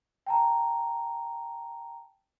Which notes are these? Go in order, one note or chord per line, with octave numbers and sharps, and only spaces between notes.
G5 A5 A#5